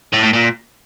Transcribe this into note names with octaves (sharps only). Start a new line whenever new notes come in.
A2
A2
A#2